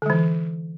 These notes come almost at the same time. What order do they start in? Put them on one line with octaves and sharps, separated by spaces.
D3 G#3 E3